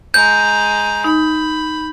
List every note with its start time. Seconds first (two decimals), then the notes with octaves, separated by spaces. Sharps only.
0.14 G#3 A#5 G6
1.04 D#4 B5